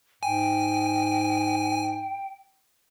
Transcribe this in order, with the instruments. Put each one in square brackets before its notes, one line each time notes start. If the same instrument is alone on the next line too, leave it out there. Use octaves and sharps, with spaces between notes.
[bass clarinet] G#2 [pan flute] G5 [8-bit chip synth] G#5